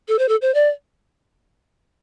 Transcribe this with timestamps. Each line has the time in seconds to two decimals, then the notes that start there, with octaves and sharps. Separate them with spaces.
0.08 A4
0.19 C5
0.29 A4
0.42 C5
0.54 D5